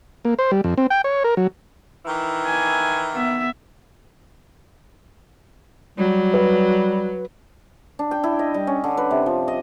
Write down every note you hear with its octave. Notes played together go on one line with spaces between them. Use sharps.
A#3
C5
G3
F2
C4
G5
C#5
A#4
F#3
D#3 E3
G#5
B3 E5
F#3 G3
B4
D4
G5
E4
D#5
G3
C#4
D3
B4
C3
F3
D#5